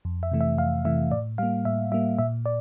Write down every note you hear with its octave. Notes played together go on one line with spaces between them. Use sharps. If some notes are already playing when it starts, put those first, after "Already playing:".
F2
E5
C3 E3 A3
E5
F2 F5
C3 E3 A3 E5
A2 D5
G3 A#3 F5
A2 E5
G3 A#3 E5
A#2 E5
D5